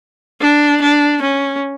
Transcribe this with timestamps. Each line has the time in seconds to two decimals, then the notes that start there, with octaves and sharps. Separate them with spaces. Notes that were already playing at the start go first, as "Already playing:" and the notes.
0.41 D4
0.81 D4
1.21 C#4